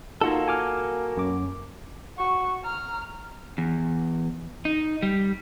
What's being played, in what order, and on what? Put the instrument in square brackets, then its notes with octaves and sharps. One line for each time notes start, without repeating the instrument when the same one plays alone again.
[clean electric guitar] A#3 F#4 A4 [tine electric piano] D#4 F4
[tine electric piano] G#5 D6 F6
F#2 D6
[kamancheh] F#4 C#6
A#5 F6
[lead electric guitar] E2
D#4
G3